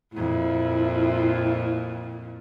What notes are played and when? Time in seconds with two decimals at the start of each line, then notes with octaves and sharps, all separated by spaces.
0.13 F2 A#2 E4